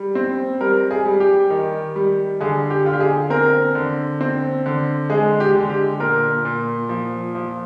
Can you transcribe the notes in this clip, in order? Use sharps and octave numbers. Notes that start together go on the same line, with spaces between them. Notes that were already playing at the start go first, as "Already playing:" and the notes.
Already playing: G3
C4
G3 A#4
G#4
G3
G4
D#3
G3
D3 G#4
G4
D3 F4
G4
G#4
C4 A#4
D3
C4
D3
G#3 G#4
G4
D3
G4
A#2 A#4
A#2
F3
F3